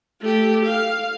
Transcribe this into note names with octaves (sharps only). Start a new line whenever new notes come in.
A3 G4
F5